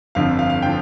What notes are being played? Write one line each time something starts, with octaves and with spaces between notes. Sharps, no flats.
G1 F2 D3 F3 F5
F5
F5
D3 F3 G5